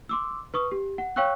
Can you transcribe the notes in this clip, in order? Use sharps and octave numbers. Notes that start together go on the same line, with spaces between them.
C6 D6 E6
B4 C#6 D#6
G4
F#5
C#5 F5 G5 C#6 E6 F#6